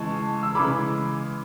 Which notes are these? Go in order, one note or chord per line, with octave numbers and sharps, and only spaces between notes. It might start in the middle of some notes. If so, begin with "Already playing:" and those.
Already playing: C#3 E3 G#3 A5 C#6
E6
C#3 E3 G#3 B5 D6